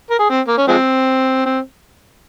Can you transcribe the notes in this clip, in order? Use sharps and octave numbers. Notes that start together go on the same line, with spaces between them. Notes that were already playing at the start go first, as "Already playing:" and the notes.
A#4
G#4
C4
A#3
C#4
F3 G#3 C4
C4